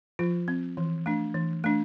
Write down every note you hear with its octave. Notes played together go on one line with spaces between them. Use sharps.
F3 F4
C4
E3
A3 D4
E3
A3 D4